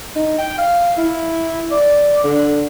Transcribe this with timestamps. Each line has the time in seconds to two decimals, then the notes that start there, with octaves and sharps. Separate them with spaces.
0.16 D#4
0.39 G5
0.59 F5
0.98 E4
1.71 D5
2.24 D3